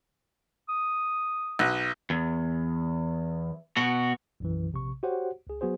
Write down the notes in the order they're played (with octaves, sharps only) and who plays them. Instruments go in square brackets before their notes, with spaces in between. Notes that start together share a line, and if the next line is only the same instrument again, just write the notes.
[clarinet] D#6
[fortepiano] B1 F#6
[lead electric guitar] E2
B2 F#4
[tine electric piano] B1 F#2 E3
A#1 C3 C#6
F#4 G4 C5 C#5 F#5
C#2 G#4
F#3 B3 F#4 G#4 C5